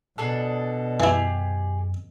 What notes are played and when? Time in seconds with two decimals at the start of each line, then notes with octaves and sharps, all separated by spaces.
0.18 B2 D4 G#4 A4
1.00 F#2 E3 E4 G4 G#4